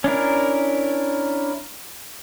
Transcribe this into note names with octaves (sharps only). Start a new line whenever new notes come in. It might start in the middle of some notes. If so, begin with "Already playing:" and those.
C#4 D4 E4 A#4